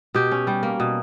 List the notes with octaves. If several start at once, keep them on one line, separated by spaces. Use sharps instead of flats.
B2 G4
C#4
G3
A#3
B2